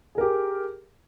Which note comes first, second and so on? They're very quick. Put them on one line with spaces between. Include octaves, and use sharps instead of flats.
G#4 A#4 G4